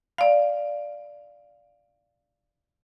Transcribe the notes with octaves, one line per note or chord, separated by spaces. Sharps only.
D5 F5